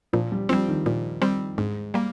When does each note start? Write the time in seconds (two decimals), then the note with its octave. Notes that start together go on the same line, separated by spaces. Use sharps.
0.13 A#2 F3
0.32 G3
0.49 F3 C4
0.53 G3
0.68 D#3
0.86 A#2 F3
1.22 G3 C4
1.58 G#2 G#3
1.94 G3 A#3